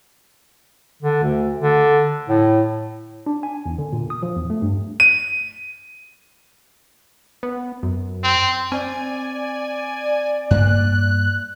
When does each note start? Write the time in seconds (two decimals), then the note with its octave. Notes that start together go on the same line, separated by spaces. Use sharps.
1.02 D3
1.23 D2
1.61 D3
2.29 A2
3.26 D4
3.43 G#5
3.66 E2
3.79 D3
3.93 A#2
4.10 D#6
4.23 F3
4.36 E2
4.50 A3
4.62 G2
5.00 D#7
7.43 B3
7.83 F#2
8.23 C4
8.72 C4 D5 G#5
10.51 G2 A#3 F#6